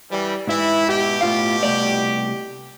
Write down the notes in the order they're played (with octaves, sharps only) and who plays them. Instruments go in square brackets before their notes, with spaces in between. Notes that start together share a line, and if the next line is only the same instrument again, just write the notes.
[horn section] E3 G3
[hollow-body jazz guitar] G#2 E5 [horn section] E3 E4
[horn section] B2 G4
[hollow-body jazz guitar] A2 F4 F5
C2 A3 D5